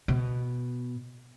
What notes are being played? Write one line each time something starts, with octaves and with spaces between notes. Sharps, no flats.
B2